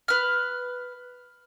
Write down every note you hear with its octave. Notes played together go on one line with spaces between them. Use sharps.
B4 F6